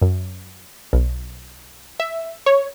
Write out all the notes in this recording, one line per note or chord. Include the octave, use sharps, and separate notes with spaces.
F#2
B1
E5
C#5